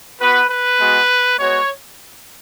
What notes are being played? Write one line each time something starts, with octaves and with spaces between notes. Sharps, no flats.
B3 F#4 B4
B4
G#3 B3 F#4
G#3 B3 F#4 C#5